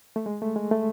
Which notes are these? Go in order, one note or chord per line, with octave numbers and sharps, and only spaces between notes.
A3
G#3
A3
G#3
A3